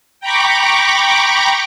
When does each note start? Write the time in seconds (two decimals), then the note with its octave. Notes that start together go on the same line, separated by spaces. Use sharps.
0.20 G5 A#5 B5 C#6 D6